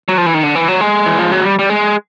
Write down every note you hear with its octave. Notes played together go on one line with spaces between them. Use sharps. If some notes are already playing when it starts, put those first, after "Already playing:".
F#3
F3
E3
D#3
D3
E3
F#3
G#3
E3
F3
F#3
G3
G3
G#3